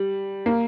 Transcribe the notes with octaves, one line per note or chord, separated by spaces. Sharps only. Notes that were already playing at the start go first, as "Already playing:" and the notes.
Already playing: G3
A#3